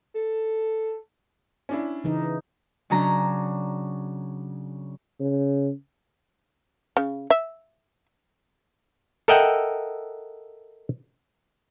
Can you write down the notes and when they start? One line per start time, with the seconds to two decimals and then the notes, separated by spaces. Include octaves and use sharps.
0.15 A4
1.69 C#4 D4 E4
2.04 C#3 E3 D#4
2.90 C#3 F#3 C#4 D4 A#5
5.20 C#3
6.97 C#3
7.30 E5
9.28 A4 A#4 D#5 E5 F#5 G5